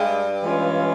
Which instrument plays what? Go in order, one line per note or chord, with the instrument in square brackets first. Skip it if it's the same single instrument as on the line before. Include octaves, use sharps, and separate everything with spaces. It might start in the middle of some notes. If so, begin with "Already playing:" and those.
Already playing: [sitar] G2 [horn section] G#3
[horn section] E3 G#3 C#4 F4